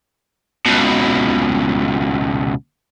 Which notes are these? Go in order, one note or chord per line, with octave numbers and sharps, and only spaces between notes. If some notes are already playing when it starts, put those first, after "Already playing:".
C#2 B2